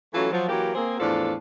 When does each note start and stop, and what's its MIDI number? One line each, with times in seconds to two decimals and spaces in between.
0.14 0.29 52
0.14 0.29 54
0.14 0.29 57
0.14 0.29 61
0.14 0.29 65
0.14 0.29 69
0.32 0.48 53
0.32 0.48 54
0.48 0.70 52
0.48 0.70 54
0.48 0.70 58
0.48 0.70 67
0.75 0.98 58
0.75 0.98 60
0.75 0.98 68
0.99 1.34 40
0.99 1.34 45
0.99 1.34 53
0.99 1.34 62
0.99 1.34 69
0.99 1.34 77